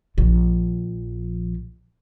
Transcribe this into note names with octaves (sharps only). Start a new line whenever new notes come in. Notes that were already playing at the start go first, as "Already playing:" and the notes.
A#1 F3